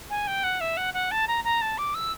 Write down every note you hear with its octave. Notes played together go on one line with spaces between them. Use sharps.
G#5
G5
F#5
E5
F#5
F#5
A5
A#5
A#5
A5
D6
E6